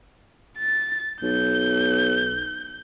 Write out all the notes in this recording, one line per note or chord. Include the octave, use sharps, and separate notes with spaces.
A6
B1 G6